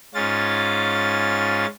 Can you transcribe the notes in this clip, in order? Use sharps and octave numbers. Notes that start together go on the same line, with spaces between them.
G#2 C#4 F4 A6